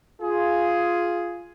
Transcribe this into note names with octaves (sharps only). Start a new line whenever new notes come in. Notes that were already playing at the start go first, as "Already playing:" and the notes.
F4 G#4